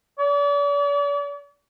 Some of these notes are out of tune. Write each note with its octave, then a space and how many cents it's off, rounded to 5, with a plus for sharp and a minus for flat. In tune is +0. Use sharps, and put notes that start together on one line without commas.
D5 -45